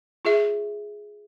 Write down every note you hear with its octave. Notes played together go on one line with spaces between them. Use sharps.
F4 G#4 E5